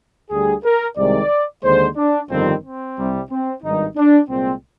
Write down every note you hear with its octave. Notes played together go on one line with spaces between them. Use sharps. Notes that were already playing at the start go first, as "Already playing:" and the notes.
D2 D3 G3 G#4
A#4
C2 C3 D#3 G#3 D5
D#2 D3 G#3 C5
D4
G1 F2 D#3 G3 C4
C4
C2 C3 G3
C4
G#1 G2 D#3 G3 D#4
D4
C2 A#2 G#3 C4